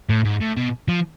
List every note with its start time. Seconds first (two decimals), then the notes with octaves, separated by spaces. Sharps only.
0.09 A2
0.25 G#2
0.41 A2
0.57 B2
0.88 F3